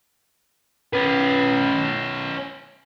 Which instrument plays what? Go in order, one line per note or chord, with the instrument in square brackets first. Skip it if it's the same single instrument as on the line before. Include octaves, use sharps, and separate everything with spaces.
[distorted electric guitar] C#4 B4